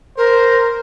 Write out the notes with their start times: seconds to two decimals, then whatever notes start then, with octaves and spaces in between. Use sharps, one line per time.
0.17 A#4 C5